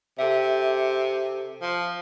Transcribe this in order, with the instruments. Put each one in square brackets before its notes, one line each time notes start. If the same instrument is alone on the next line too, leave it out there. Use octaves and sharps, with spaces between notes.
[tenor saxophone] C3 [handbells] A4 E5
[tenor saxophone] F3